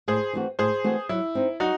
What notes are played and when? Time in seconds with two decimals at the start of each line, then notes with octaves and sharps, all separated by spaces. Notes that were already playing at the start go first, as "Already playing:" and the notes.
0.08 A2 G#4 C5
0.33 E3 A3 C4 F#4
0.59 A2 G#4 C5
0.84 E3 A3 C4 F#4
1.09 F#3 E4
1.35 C4 D#4
1.60 F#3 D#4 F#4